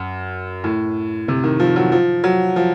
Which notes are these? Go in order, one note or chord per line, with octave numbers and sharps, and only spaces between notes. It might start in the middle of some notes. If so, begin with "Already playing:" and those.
Already playing: F#2
A2
C3
D#3
F3
F#3
F3
F#3
F3